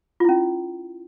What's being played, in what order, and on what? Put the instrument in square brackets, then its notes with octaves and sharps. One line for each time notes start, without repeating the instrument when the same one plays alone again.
[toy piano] F4
E4
C#4